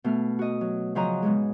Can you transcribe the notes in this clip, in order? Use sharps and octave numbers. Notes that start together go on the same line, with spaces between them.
B2 A3 F6
F#4 D#5
F#3
C#3 F3 F#3 C#4 D#5 A#5
G#2 B2 G#3